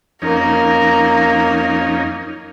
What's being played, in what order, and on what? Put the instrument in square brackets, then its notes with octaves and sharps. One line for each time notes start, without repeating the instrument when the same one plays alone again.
[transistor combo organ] F2 C#4 D#4 [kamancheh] A#3 A#4